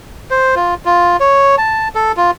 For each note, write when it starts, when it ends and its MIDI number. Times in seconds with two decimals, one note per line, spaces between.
0.30 0.55 72
0.56 0.74 65
0.85 1.17 65
1.20 1.56 73
1.58 1.88 81
1.95 2.12 69
2.17 2.31 65